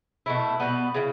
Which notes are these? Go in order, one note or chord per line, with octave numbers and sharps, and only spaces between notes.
B2 A3 E4
B2 G3 B3
C#3 E3